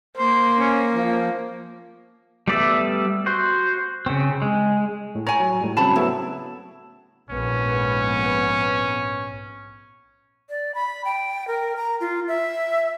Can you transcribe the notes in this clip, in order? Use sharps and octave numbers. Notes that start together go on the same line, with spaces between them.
A#3 C5
C#4
F3
G3 A3 B3 D5 E5
F#4 C5
C#3 C4
G#3
A2
C#5 G#5 A#5
F#3
A2 G3
C#3 F#3 C4 A5 B5
F#3 A3 B3 E4
A#1 G#2 B3 C#4
D5
B5
G5
A#4
A#5
F4
E5